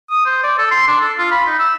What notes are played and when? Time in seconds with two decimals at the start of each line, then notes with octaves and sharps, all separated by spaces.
0.10 D#6
0.26 C5
0.43 D5
0.58 A4
0.71 C6
0.88 D4
1.01 A4
1.18 F4
1.31 B5
1.47 D#4
1.59 E6